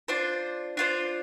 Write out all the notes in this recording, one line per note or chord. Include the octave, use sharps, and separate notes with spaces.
D4 F4 C5
D4 F4 C5